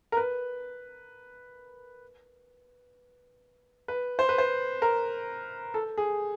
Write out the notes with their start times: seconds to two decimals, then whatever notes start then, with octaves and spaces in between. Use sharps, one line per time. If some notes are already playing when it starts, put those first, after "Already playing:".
0.12 A#4
0.17 B4
3.88 B4
4.19 C5
4.29 B4
4.38 C5
4.82 A#4
5.74 A4
5.98 G#4